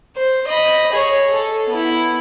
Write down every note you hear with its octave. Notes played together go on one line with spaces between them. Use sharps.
C5
D#5 B5
G#4 C#5
A4
B3 E4